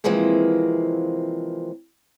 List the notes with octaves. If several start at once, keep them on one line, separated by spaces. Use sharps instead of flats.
C3 E3 F3 G#3 A#3 C4